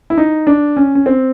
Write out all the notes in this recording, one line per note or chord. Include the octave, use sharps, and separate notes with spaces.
E4
D#4
D4
C#4
C#4
C4